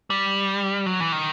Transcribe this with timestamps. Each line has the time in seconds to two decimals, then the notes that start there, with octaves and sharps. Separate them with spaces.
0.10 G3
0.86 F#3
1.00 E3
1.12 D#3